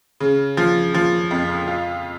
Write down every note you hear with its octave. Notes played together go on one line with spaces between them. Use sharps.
C#3
F3
F3
F2
F4